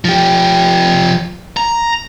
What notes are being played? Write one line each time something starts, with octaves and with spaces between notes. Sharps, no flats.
F3 G4
A#5